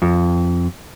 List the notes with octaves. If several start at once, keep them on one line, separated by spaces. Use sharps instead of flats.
F2